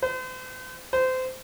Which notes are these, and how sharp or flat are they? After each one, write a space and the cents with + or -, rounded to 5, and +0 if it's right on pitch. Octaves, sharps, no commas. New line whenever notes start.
C5 -45
C5 -25